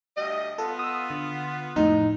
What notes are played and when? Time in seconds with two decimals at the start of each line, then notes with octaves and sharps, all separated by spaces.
0.17 D2 G3 D#5
0.58 B3 F4 A4
0.79 D#6 E6
1.10 D3
1.76 F2 A2 D#4